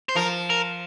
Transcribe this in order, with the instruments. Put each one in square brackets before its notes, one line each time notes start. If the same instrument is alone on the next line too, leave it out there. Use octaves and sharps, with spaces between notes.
[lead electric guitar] C5
[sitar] F3 [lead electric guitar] A#4
[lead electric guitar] A#4